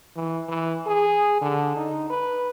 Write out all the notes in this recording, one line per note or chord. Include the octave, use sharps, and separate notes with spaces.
E3
E3
G#4
D3
D#4
B4